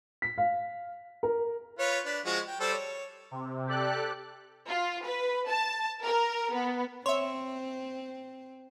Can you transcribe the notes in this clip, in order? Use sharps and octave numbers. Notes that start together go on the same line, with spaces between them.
B6
F5
A#4
F4 B4 C#5
D4 B4
F3 G#3 F#4
G5
G3 A4 C5
C#5
C3
G4 A4 D5 F#6
F4
B4
A5
A#4
B3
C4 C#5 E5 C6